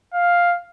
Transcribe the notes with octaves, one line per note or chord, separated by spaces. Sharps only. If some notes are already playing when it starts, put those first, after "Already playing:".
F5